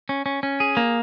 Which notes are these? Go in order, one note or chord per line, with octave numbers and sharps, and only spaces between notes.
C#4
C#4
C#4
G#4
A#3